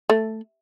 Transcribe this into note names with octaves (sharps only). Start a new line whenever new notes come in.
A3